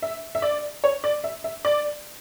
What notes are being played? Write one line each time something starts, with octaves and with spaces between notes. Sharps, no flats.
E5
E5
D5
C#5
D5
E5
E5
D5